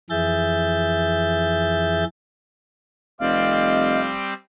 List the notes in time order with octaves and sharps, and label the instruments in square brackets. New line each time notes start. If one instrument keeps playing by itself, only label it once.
[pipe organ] F2 E3 G#4 E5 G6 A6
[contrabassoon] F1 [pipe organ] G3 C4 D5 [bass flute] D#5 [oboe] F5